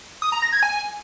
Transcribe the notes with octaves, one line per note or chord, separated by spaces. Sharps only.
D#6
A#5
A#6
G#6
G#5